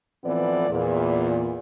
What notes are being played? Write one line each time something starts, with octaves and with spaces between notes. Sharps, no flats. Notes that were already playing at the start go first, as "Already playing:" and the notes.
A2 E3 F3 B3 C4 D5
E2 A#2